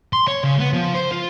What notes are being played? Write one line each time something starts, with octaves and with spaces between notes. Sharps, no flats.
C6
C#5
C#3
B3
F3
C5
F4